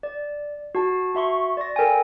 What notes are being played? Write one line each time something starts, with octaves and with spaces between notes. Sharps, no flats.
D5
F#4 A5
F#4 E5 C6 C#6
D5 A#6
A4 A#4 G5 G#5